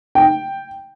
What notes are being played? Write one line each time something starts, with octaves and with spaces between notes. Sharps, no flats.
G5